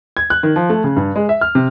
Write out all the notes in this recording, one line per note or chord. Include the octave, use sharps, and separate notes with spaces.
G#6
F#6
D#3
F3
A3
C#3
G2
G#3
E5
F6
C3